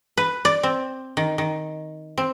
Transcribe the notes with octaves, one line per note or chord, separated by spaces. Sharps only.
B4
D5
C4
D#3
D#3
C4